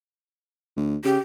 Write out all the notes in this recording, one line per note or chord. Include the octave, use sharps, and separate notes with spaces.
D2
C#3 G4